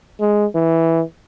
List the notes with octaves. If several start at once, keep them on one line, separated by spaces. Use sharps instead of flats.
G#3
E3